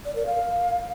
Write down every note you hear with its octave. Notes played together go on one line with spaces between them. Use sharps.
D5
A#4
F5